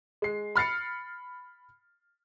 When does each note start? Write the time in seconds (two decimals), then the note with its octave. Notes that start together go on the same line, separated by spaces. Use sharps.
0.22 G#3 C7
0.56 B5 F6 A6 C7 C#7